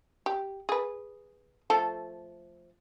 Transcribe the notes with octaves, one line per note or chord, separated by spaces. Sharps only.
G4
G#4 B4
F3 A3 A4